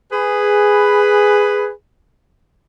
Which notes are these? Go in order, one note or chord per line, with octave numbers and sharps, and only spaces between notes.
G#4 B4